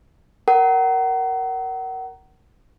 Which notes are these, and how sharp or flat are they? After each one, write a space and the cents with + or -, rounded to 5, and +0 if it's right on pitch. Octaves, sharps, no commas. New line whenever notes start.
A#4 +0 F#5 +35